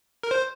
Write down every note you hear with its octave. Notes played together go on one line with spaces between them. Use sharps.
A#4
C5